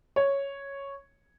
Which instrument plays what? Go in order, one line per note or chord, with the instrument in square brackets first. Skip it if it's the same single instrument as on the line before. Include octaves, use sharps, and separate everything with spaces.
[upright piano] C#5